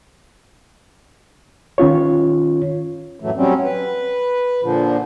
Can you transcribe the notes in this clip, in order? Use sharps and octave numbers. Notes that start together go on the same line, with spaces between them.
D#3 C#4 F4 C#5
F#2 A2 E3 F#3 A3
F#3 G3 C4 C#4
B4
A#2 D3 F3